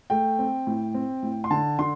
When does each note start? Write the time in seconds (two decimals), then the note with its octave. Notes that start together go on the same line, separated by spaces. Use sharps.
0.10 A3 G5
0.39 C4
0.67 A2
0.94 C4
1.23 A2
1.44 C6
1.50 D3 A5
1.79 D3 C6